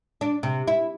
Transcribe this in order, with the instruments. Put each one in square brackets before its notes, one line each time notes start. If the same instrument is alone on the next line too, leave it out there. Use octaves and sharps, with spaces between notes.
[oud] D4
C3
E4